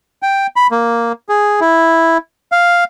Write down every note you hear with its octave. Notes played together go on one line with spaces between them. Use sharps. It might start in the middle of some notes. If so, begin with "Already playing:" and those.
G5
B5
A#3
G#4
E4
F5